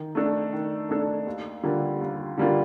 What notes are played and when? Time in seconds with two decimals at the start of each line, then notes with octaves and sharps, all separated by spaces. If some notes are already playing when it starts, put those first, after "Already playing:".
Already playing: D#3
0.15 A3 D4 A4
0.53 D#3
0.89 A3 D4 A4
1.27 D#2
1.63 D3 G3 A#3 F4
2.01 D#2
2.37 D3 G3 A#3 F4